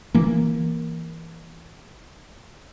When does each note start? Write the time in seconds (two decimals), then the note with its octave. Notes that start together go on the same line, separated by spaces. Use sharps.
0.14 E3 A#3